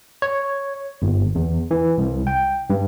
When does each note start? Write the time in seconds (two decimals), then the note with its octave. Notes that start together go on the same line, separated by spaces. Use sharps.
0.22 C#5
1.02 G1
1.35 E2
1.71 E3
1.98 C2
2.27 G5
2.70 G2